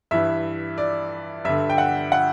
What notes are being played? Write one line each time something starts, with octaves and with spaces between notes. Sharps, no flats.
G2 E3 E5
D5
G2 D3 E5
G5
F#5
F#5